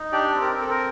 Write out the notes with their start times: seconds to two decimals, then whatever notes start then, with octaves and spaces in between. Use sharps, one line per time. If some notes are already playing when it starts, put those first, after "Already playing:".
Already playing: D#4
0.12 D4 G4 D5
0.34 C4
0.41 A#4
0.56 C4 A4
0.70 A#4